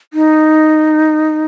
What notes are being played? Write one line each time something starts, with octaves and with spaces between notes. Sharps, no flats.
D#4